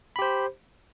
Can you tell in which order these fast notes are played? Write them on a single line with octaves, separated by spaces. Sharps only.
B5 G4 C5